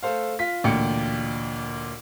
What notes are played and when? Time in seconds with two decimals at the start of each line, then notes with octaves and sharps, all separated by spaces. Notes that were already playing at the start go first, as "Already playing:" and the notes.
0.03 A3 A4 C5 F5
0.39 F4 B6
0.64 A1 D2 A#2 G5 C#7